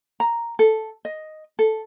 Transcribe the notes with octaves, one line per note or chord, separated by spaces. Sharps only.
A#5
A4
D#5
A4